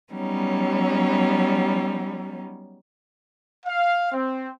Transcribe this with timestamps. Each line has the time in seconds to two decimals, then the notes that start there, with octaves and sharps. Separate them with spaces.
0.13 F#3 G3 B3 C#4 D#4
3.66 F5
4.13 C4